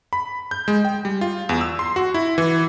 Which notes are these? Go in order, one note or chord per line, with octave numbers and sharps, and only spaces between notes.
B5
G6
G#3
G5
G3
F4
E2
E6
C6
F#4
E4
E3